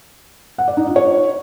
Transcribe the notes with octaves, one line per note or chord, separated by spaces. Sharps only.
F#5
D5
D#4
F4
C#5